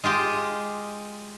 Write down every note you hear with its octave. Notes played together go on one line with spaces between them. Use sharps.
G#3 F4 G4 D#5